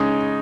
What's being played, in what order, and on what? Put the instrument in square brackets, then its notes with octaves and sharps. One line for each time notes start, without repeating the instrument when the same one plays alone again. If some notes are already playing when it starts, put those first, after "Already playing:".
Already playing: [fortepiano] C#3 G#3 D#4